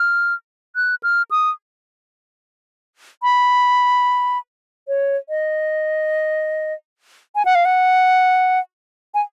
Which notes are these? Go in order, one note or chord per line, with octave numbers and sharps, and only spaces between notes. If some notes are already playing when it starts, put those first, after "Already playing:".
Already playing: F6
F#6
F6
D#6
B5
C#5
D#5
G#5
F#5
F5
F#5
G#5